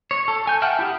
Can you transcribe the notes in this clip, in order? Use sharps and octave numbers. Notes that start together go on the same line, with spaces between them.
C#5
A4
G#5 G6
E5 F#5 G5 A5 F6
E4 G4 G#4